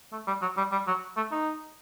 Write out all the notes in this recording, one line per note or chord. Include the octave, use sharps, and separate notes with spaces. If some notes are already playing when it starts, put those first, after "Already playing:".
A3
G3
F#3
G3
G3
F#3
A3
D#4